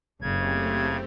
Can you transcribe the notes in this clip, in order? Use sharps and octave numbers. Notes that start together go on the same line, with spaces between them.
F#1 C#3 A3 C4 G4 G#6